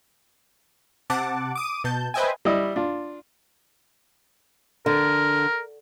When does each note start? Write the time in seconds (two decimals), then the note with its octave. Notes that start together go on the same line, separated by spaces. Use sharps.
1.10 C3 F#5 A5 D6
1.55 D6 D#6 D#7
1.84 B2 A5 G6
2.14 B4 C5 D#5 E5 G5 G#5
2.45 G3 E4 D#5
2.76 D4 F4
4.86 D3 A#4